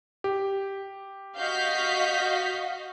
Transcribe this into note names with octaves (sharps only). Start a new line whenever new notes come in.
G4
F#4 D#5 F5 G6 B6